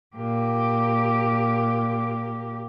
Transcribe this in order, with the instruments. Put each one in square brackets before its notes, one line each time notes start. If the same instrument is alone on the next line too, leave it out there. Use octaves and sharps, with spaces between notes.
[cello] A#2 G4